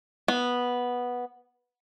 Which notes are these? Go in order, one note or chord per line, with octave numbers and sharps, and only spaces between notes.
B3